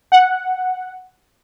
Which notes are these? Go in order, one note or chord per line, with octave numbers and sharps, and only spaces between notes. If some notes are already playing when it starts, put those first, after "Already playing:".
F#5